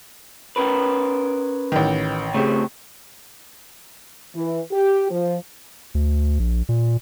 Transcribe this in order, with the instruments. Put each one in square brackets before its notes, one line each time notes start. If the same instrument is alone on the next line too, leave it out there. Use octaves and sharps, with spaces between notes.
[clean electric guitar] C#4 A#4 B4
[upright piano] A1 D#3
[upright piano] C#3 [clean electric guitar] A3 C4 G4
[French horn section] E3
G4
F3
[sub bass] D2
A#1
A#2